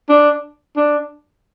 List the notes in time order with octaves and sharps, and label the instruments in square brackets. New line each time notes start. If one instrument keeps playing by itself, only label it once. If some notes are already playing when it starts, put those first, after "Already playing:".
[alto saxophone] D4
D4